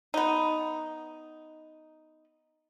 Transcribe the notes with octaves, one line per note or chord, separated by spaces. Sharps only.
B3 D#4